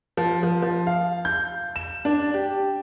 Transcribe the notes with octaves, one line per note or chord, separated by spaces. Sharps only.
F3
F3
F3
F5
G6
E7
D4
G4